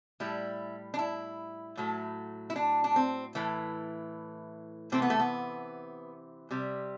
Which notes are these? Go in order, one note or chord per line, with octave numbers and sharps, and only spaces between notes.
A2 G3 E4
D4
E4
A2 F#3 A3
E4
D4
D4
C4
A2 E3 A3
C3 E3 A3 C4
B3
A3
B3
C3 G3